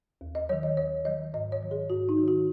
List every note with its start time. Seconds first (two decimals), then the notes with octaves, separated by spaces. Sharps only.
0.21 D#2
0.35 D#5
0.49 D#3 F#3 C#5
0.63 D#5
0.77 D#2 C#5
1.05 D#3 F#3 D#5
1.34 G#2 D#5
1.52 C#5
1.62 D#3 F#3
1.71 G#4
1.90 G#2 F#4
2.09 D#4
2.18 D#3 F#3
2.28 F#4